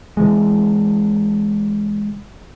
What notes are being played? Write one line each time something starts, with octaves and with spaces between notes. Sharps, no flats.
C3 E3 G#3